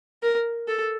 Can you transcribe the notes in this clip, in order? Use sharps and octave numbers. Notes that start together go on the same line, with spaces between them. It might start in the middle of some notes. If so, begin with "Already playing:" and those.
A#4
A4